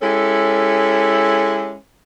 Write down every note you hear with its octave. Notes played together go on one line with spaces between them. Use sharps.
G#3 C#4 E4 G4 A4